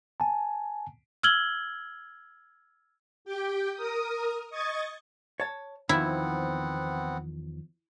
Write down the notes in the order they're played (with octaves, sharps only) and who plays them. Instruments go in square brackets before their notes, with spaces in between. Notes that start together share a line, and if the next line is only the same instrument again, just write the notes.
[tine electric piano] G#5 A5
[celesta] E6 F6 G#6 F#7 G7
[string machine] G4 G5
A#4 D#6
D#5 C#6 D#6 G#6 A6
[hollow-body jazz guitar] C#5 A5
[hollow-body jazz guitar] E2 D#3 F3 [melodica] B3 C4 F#5 [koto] E4